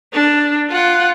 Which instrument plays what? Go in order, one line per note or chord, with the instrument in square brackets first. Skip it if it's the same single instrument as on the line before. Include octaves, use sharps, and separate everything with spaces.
[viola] D4
F4 F#5